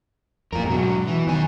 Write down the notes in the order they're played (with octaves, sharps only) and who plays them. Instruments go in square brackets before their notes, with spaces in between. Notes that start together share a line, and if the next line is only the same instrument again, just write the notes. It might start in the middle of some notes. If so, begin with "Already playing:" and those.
[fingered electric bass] F2 A2 [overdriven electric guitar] F4 A#4
[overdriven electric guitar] G#2 F#3 [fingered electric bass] B2
[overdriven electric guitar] E3
[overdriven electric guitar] F#2 G#5 [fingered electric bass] D#3